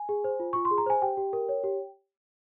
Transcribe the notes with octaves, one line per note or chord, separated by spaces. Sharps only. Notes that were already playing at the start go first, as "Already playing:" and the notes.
Already playing: G#5
G#4
C5
F4
F4 C#6
C6
G#4
A#5
C5 G#5
G4 G5
G4
A#4
C#5
G4